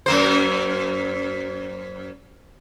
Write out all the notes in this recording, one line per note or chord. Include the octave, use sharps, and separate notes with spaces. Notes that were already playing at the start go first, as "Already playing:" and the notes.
F#2 A#3 C5